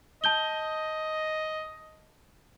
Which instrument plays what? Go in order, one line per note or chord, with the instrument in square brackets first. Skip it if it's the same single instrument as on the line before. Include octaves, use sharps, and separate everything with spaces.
[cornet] D#5 [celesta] A5 G6 G7